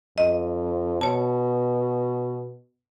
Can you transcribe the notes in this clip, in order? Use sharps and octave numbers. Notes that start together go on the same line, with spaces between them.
F2 D#5
B2 C#5 A5